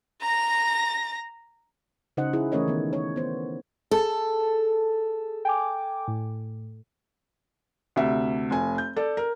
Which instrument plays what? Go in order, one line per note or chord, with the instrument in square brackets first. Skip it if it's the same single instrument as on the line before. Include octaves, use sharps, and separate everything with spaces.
[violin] A#5 A#6
[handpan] C#3 D#4 C5 D#5 F#5
E4 G#4
E3 A3 C#4 A#4 C#5 D#5
D#3 B3
C#5
B3 C5
[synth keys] G#4 A5 [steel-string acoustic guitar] A4
[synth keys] G5 G#5 D6
A2
[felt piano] D2 C3 E5
F1 G#5
G6
A4 D5
A#4